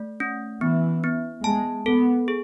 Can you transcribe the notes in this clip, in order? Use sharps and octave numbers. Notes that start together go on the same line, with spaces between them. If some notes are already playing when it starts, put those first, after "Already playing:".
Already playing: A3
C#4
E3 B3
B3
G#3 A5
B3 A4
G#4